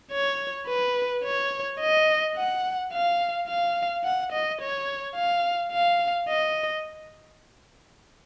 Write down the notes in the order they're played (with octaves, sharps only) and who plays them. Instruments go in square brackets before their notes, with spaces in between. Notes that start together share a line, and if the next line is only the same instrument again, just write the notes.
[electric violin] C#5
B4
C#5
D#5
F#5
F5
F5
F#5
D#5
C#5
F5
F5
D#5